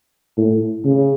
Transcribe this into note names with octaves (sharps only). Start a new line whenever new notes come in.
A2
C#3